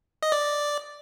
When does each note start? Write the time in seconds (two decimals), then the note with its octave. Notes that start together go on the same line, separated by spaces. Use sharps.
0.23 D#5
0.32 D5